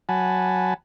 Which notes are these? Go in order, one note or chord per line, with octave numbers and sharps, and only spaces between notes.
F#3 F#5 G#5 A5 B5